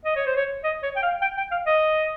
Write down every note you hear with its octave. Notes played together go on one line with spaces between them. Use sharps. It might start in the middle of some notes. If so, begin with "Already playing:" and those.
D#5
C#5
C5
C#5
D#5
C#5
G5
F5
G5
G5
F5
D#5